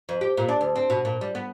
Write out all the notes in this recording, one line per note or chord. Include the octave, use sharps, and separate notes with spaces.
F2
G4
A#2
D4
D2
C4
B2
A#2
G3
B3